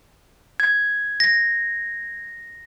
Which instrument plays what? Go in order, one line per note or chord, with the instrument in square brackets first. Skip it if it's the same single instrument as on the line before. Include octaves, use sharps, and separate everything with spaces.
[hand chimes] G#6
[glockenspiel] A#6